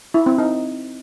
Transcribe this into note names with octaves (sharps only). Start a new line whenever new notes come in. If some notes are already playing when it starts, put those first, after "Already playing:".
E4
C4
D#4